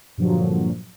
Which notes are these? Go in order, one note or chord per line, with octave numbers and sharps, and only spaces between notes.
G2 A#2 D3 F3 F#3